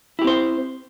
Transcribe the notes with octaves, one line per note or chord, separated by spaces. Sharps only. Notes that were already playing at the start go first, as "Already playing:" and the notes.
C4 E4 G4 C5